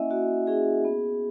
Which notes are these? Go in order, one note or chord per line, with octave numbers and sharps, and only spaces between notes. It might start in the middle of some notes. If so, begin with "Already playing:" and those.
Already playing: A#3 C#4 E4 D#5 E5 F#5 G#5
A#3 F#4
C#4 E4 G#4
B3